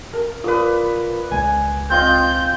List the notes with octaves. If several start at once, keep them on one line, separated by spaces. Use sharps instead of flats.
A#4
F4 A#4 B4 D5 D#6
C#2 G#5 G#6
C4 F4 D#5 G6